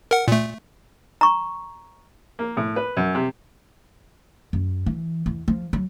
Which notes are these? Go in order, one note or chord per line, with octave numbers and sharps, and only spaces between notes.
A#4 F#5
A#2 A3
A#5 C#6
A#3
A2
B4
F#2
C3
F#2
E3
E2
F3
F#3